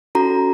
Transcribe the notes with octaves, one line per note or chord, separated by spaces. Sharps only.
C#4 F#4 A4 A#5